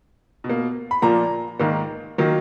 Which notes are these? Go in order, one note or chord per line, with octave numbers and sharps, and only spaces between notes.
B2
A#3
B5
A#2 F3 A#3 A#5
G#2 D#3 A#3
D#3 F#3 A#3